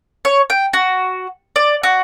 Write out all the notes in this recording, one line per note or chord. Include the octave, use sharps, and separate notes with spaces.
C#5
G5
F#4
D5
F#4